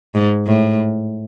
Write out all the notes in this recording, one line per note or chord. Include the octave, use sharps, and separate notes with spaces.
G#2
A2